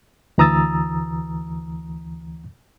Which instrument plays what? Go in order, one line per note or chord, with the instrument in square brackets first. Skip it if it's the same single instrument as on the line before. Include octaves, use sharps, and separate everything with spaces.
[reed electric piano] D2 E3 A#5 D#6 E6 A6